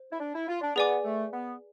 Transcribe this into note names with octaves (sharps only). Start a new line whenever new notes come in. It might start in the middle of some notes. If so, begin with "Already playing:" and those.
Already playing: C5
E4
D4
E4
F4
D4
B3 G#4 B4 D5 G#5 D6
A3
B3